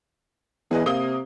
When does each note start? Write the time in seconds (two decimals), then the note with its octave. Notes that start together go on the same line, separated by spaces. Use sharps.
0.71 E2 G#4 B4 D#5
0.86 C3 A#3 D#6 G7